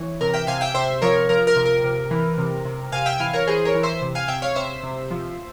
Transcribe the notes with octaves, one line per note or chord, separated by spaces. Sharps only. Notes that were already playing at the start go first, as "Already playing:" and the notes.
Already playing: E3 C#5
C3 A#4
E5 G5
C3 F5 G#5
E5 G5
C3 C5 E5
F3 A#4 C#5
F3 A#4
A#4
C3
A#4
C3
E3
C3
C3
C3 F5 G#5
E5 G5
E3 F5 G#5
A#4 C#5
E3 G#4 C5
A#4 C#5
E3
C5 E5
C3
F5 G#5
C3 E5 G5
C#5 F5
C3 C5 E5
C3
F3